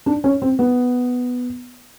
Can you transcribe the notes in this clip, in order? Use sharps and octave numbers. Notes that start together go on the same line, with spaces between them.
D4
C#4
C4
B3